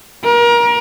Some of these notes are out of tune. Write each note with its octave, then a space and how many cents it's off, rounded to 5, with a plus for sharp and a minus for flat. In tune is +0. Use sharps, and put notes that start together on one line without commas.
A#4 +30